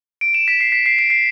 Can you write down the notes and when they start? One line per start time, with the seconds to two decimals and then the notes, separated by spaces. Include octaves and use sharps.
0.21 D7
0.34 E7
0.48 B6
0.61 C7
0.72 B6
0.86 C7
0.99 D7
1.10 C7